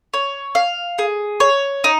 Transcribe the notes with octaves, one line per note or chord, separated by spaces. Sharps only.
C#5
F5
G#4
C#5
D#4